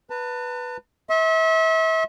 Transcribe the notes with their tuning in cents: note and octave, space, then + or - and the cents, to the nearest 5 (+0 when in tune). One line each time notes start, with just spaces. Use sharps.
B4 -5 A5 +40
E5 -35 C6 +35